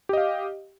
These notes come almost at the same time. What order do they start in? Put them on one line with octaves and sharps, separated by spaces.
G4 D#5 F5